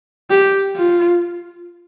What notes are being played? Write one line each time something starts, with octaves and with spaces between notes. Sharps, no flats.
G4
F4